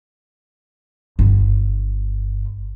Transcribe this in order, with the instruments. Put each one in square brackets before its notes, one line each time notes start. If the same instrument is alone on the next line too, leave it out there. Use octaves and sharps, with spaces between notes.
[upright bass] G1